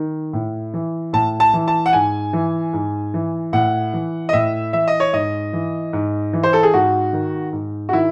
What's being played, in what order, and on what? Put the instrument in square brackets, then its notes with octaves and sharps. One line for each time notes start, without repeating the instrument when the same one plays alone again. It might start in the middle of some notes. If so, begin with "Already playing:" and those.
Already playing: [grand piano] D#3
A2
E3
A2 A5
A5
E3
A5
F#5
G#2 G#5
E3
G#2
E3
A2 F#5
E3
D#5
A2 E5
E3 E5
D#5
C#5
G#2 D#5
E3
G#2
E3
C5
A4
G#4
G#2 F#4
D#3
G#2
F#4
D#3 E4